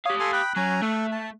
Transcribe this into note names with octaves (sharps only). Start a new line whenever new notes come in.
G4 C#5 F5 D#6
A4 G#5 C6
G5 B5 F#6
F#3 C#4 G#5 A#5
A3 A4
A5